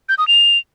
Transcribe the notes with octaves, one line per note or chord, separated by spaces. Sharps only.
G6
D#6
F7